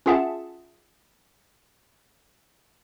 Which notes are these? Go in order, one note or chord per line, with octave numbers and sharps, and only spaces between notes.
C#4 F4 G#4 E5 F#5 A5